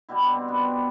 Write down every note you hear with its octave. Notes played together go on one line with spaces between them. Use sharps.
B2 G3 E4
D4
C4
B3 D4